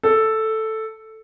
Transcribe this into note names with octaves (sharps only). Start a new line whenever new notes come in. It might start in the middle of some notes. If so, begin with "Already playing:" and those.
A4